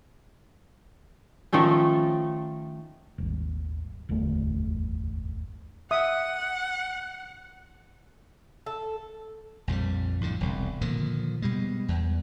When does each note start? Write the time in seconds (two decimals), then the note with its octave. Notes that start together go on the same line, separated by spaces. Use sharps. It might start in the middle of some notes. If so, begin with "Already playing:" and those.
1.53 D#3 F3 A3 C#4
3.18 D#1 G#1
4.09 D1 G1 E2 A3
5.91 E5 F#5 D#6
8.66 A4
9.68 A#1 F2 D#3 G3
10.21 F2 A2 D3
10.40 E1 C2
10.81 A#2 D3 D#3 F3
11.42 B2 G3 G#3
11.88 E2